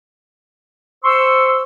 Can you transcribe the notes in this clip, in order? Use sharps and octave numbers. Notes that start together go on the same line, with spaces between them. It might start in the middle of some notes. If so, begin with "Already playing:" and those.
C5 C6 C#6 E6